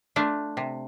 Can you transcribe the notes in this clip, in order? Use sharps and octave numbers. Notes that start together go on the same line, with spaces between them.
A3 D4 F4
C3